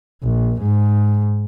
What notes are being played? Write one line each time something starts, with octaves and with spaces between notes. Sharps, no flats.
A#1
G#2